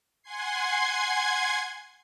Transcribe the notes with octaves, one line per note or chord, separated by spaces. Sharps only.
F#5 G#5 C6 G#6 C7